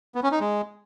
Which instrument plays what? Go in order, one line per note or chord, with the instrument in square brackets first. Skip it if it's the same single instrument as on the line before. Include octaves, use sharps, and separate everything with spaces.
[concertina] B3
C#4
D#4
G#3